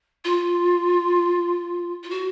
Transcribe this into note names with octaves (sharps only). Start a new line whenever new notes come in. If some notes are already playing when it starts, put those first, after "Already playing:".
F4
F4
F#4